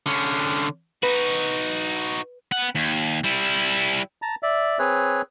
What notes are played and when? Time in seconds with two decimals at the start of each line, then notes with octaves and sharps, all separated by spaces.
0.06 D3 C#4
1.03 D#4 F#4 B4
2.52 B3 F#5
2.75 D#2
3.24 G3 E4
4.22 A5 A#5
4.43 D5 E5
4.79 C4 G#4 B4 C#5